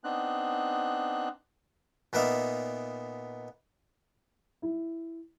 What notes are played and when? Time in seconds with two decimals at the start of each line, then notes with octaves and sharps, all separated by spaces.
0.04 B3 C4 D4 D#4 F#6
2.13 A#2 B3 D#4 D5 E5 F5
4.62 E4